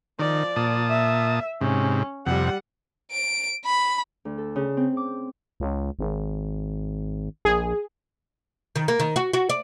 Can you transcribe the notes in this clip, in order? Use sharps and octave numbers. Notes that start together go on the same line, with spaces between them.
D#3 F3 D5
A#2 A5 D#6
E5
G#2 C3 C#4
F2 C3 G3 F#5
D7
B5
D2
A4
C#3
C4
D6
C#2
G#1
A#1 G#4
D#3
A#3
D#3
F#4
F#4
D5